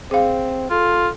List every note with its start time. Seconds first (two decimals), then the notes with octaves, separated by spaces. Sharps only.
0.11 C4 G#4 F5
0.70 F4 A4